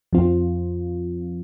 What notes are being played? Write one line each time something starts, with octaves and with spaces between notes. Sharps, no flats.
F2 F3 C4 F4